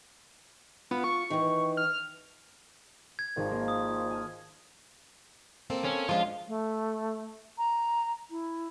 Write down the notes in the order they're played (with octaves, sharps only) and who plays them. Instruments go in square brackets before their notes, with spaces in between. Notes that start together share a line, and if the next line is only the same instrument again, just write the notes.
[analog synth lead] B3 [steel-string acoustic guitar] F4
[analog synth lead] C#6
[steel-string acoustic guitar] D#3 E3
[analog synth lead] F6
[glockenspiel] G#6
[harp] G#1 [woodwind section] A#2 D#3 F3
[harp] G#3 A#3 A#4
[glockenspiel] D#6
[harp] G#5 A5 F6
[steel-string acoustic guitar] A#3 C4 A4
[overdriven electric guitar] C#4
[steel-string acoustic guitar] F3 G#3 D4 [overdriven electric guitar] F4
[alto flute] A3
A#5
E4